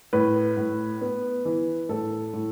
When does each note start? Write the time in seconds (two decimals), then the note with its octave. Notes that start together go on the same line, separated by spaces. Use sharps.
0.13 A2 B4
0.57 A2
1.01 B3
1.45 E3
1.89 A2 A4
2.34 A2